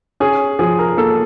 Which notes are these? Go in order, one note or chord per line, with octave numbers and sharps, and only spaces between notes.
C#4 G#4
F3 G#4
A#4
A#3 A4